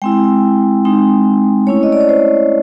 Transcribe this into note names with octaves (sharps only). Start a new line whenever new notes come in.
G#3 C4 E4 G5
G#3 C4 D#4
A3 C#4 E4 C#5
D#5
D5
C#5
C5